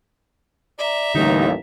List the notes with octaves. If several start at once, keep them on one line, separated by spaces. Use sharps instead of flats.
D5 E5 A#5
A1 D#2 D3 G3 D#4